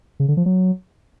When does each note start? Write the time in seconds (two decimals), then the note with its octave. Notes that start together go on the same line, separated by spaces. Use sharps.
0.20 C#3
0.28 D3
0.37 F3
0.46 F#3